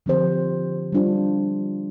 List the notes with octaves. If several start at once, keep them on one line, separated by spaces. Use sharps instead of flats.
D3 F3 C4 G4 C5
G3 D4 F4 C5